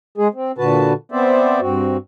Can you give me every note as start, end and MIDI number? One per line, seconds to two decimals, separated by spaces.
0.18 0.28 56
0.18 0.28 68
0.34 0.52 60
0.58 0.93 46
0.58 0.93 50
0.58 0.93 66
0.58 0.93 71
0.58 0.93 81
1.12 1.60 59
1.12 1.60 60
1.12 1.60 72
1.12 1.60 74
1.12 1.60 76
1.60 1.97 43
1.60 1.97 60
1.60 1.97 66